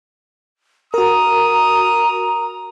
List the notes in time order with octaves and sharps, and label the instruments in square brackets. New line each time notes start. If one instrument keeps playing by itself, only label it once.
[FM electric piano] F#4 A#4 [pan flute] A#5 [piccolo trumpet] D#6